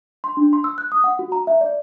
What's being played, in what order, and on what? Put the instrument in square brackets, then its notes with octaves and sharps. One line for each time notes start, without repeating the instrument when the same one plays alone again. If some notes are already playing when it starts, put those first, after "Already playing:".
[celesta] C6
D4
C6
E6
F#6
D#6
F#5
F#4
A#5
E5
D5